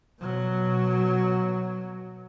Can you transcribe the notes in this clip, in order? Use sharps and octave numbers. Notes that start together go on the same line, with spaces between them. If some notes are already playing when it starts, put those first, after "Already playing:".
B2 F#3